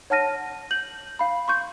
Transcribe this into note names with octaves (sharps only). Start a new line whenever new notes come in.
C#5 F#5 A5 F6 A#6 D#7
G6 F#7
F5 B5
C6 C#6 G6